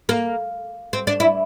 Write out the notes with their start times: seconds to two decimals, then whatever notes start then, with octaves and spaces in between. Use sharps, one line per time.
0.09 A#3
0.93 C4
1.07 D4
1.20 E4